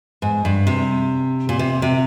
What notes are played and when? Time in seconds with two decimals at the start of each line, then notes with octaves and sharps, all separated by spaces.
0.22 G#2
0.45 G2
0.67 C3
1.49 A#2
1.59 C3
1.82 C3